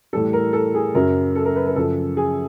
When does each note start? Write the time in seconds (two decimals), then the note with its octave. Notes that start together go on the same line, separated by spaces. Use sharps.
0.13 A2 E3 G3 A4
0.33 A#4
0.53 A4
0.75 G#4
0.94 F#2 C#3 F#3 A#4
1.36 A4
1.45 A#4
1.56 B4
1.66 A#4
1.76 F#2 C#3 F3 A4
2.17 G#4